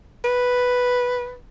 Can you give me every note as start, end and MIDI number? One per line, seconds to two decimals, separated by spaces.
0.24 1.36 71